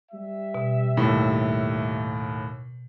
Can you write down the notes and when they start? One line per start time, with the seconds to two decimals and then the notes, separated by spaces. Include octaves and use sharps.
0.12 G3 E5
0.55 B2
0.97 D#2 A2